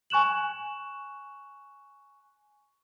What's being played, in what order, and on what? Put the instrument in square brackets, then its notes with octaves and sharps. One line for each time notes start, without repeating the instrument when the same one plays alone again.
[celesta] G#5 C#6 F#6 E7 F#7